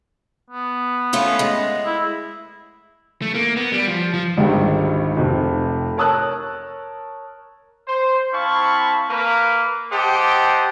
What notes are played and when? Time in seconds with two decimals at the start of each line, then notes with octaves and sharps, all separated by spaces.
0.50 B3
1.13 A3 C#4 F4
1.39 G#3
1.86 E4
3.22 A3
3.34 A#3
3.56 B3
3.72 G3
3.87 F3
4.14 F3
4.37 G#1 C#2 D3 D#3 G3
5.17 F1 C3
5.98 A#4 C#5 A5 D#6 E6 F#6
7.88 C5
8.33 C4 E4 F5 A5 B5 C#6
9.09 A#3 B4
9.92 G4 C5 D#5 F#5 G5 A5